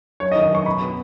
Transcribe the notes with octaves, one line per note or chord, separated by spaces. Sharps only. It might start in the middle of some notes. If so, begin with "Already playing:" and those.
F#2 C#5
D#5
D#3
D#5
F#2 C#6
B2 B5
B3